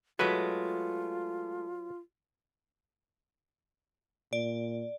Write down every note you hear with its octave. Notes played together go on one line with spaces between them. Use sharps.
F#3 G#3 A3 F4 B4
A#2 D5